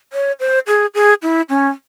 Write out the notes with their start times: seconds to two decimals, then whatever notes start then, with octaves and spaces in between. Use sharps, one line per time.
0.13 C#5
0.40 C5
0.67 G#4
0.95 G#4
1.23 E4
1.49 C#4